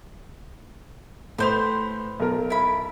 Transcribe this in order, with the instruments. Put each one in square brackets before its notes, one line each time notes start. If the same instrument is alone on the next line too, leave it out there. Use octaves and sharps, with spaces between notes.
[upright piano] A2 G6 F7 [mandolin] B4 C5 C6
[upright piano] B1 A#4
[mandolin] E4 B5